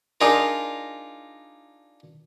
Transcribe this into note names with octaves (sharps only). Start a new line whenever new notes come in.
D4 D#4 F4 G#4 A#4